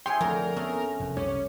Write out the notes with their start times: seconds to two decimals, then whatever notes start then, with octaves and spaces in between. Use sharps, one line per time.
0.06 E4 G#4 C#5 G5 G#5 C6
0.21 F2 D3 F3 A3 A#4
0.56 A3 B3 C#4 G#4
1.00 F1 E2
1.17 C2 F#2 C3 C#4 G4 C#5